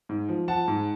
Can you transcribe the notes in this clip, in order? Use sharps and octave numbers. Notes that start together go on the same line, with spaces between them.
G#2
F3
F3 F#5 A5
G#2